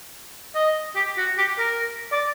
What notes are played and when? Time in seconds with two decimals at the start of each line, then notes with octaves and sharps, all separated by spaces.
0.55 D#5
0.95 G4
1.18 F#4
1.38 G4
1.58 A#4
2.12 D5